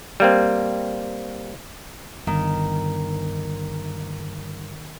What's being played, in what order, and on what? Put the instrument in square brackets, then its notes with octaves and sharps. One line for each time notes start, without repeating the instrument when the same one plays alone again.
[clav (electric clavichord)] G3 A#3 C4
[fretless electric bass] G1 [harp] D#3